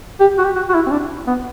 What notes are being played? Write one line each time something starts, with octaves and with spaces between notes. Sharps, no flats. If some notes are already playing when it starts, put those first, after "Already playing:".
G4
F#4
G4
F#4
F#4
E4
C4
D4
B3